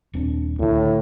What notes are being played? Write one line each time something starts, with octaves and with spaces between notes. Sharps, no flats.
D#1 C4 D4
C#2 A2 D3